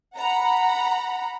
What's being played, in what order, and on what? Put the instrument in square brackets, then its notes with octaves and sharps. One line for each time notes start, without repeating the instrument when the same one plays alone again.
[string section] F#5 A#5 B5